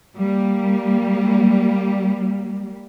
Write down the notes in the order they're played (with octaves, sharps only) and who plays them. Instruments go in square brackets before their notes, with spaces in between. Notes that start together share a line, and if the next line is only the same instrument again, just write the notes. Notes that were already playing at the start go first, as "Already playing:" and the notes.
[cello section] G3 A#3